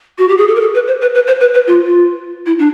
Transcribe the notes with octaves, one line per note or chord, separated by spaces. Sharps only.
F#4
G4
G#4
A4
A#4
A4
B4
C5
B4
B4
C5
B4
B4
F4
F4
E4
D4